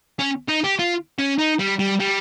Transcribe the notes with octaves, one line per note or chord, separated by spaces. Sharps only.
C#4
D#4
G4
F4
C#4
D#4
G3
G3
G3